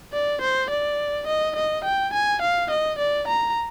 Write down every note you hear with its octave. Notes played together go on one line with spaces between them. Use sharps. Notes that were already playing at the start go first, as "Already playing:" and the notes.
D5
C5
D5
D#5
D#5
G5
G#5
F5
D#5
D5
A#5